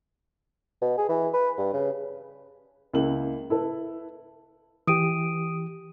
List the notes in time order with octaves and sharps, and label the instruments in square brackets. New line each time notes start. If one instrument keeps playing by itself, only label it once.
[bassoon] B2
G#4
E3
B4
G2
C#3
[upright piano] C#2 A#3 E4 F#7
E4 A4 B4
[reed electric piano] E3 G4 [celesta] D#6 D7 D#7